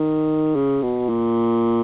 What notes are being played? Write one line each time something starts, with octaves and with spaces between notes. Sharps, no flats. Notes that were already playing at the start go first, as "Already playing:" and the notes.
Already playing: D#3
C#3
B2
A#2